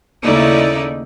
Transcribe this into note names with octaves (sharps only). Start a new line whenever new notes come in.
D#2 C#3 A3 D#4 E4 D5